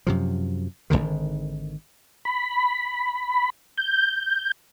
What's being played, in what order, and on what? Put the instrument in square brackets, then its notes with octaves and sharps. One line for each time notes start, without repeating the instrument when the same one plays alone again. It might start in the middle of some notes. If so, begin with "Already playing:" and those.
[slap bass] F#2 C3 F3
G#1 D2 D3 D#3
[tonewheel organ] B5
G6